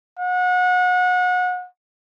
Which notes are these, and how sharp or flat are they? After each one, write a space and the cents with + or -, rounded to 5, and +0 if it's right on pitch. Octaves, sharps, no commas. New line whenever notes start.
F#5 -30